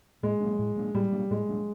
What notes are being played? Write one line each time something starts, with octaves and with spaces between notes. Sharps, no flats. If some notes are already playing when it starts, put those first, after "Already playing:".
A2 G#3
F#3 A#3 D4
A2
F#3 A#3 D4
A2 G3
F#3 A#3 D4
A2 G#3
F#3 A#3 D4